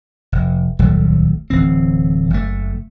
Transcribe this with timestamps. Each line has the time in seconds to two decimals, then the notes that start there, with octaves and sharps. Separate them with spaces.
0.32 F1
0.79 D#1 C#2 F#3 A3
1.50 D1 E3 C4
2.30 F#1 A3